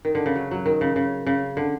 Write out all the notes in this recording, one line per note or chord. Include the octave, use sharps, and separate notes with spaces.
D#3
D3
C#3
F#3
F#3
D#3
C#3
C#3
C#3
D3